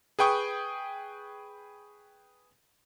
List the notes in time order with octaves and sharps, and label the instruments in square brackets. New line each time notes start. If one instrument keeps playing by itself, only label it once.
[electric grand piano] G#4 B4 G5 C#6 D#6